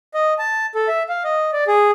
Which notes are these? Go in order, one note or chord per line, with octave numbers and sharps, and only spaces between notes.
D#5
A5
A4
E5
F5
D#5
D5
G#4